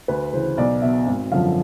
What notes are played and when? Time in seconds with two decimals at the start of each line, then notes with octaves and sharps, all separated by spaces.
0.08 D2 B4
0.32 C#3 E3 C5
0.57 B1 D5
0.82 B2 E5
1.07 G#1
1.32 F#2 D3 F3 F5